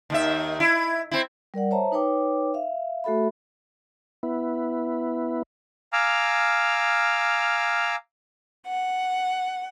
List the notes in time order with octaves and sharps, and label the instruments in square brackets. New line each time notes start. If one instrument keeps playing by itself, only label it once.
[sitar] D#2 D#3 E5
E4
C4 E4
[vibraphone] G3 A#4 D5 F#5
C5 C#5 E5 A5 A#5
D#4 B4 C#5 G5 D6
E5 F5
A3 F#4 A4 E5 B5
[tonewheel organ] B3 E4
[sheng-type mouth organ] F5 G#5 A#5 D6 E6 F6
[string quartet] F#5